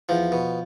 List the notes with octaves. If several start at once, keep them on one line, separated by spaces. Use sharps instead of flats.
E2 F3
B2